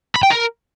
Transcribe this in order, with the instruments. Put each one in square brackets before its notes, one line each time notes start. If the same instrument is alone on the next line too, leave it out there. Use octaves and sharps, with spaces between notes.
[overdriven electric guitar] B5
G5
A#4